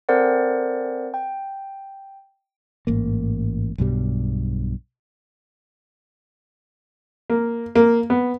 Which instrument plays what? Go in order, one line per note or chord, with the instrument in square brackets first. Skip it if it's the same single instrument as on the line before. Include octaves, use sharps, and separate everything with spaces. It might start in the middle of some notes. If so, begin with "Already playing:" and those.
[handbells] C4 A4 A#4 C5 D5 F#5
G5
[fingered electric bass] A1 G#2 A#3
B1 G2 B2 G3
[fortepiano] A#3
A#3
B3